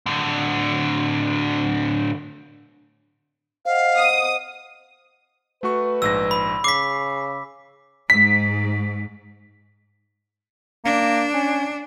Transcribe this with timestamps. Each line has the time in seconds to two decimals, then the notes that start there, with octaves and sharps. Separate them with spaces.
0.06 A2 D3
3.65 C5 D#5 F5 F#5
3.97 D#6
5.63 A3 F#4 B4 C#6
6.02 A#1 G#2 E6 A#6
6.31 B5
6.64 C#3 D6 B6 C7
8.10 G#2 B6
10.85 A#3 D4
11.34 C#4